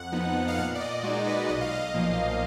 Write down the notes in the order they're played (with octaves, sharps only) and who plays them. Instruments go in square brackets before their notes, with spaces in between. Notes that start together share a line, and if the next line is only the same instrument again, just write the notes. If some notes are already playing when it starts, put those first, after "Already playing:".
Already playing: [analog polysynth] F2 F#5
F3 B3 D#4
F5
A#2 F#5
D5
D#5
G#3 F#4
D#4
B4
B1 D#5
F5
D#5
A#2 F3 A#3